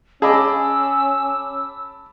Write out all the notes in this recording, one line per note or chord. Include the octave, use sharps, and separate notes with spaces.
C#4 G#4 D#5 A5 B5 D6 E6